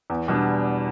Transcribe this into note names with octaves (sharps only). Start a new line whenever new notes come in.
E2
B2 G3 D4